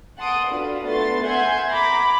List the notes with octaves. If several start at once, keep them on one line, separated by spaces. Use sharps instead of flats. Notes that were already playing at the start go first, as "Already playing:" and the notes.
F#5 A5 C6 D#6 D7
D4 F4 F#4 A4 B4
A3 B3 D4 C6 A6
E5 F#5 G#5 C6 G6 G#6
A#5 B5 D6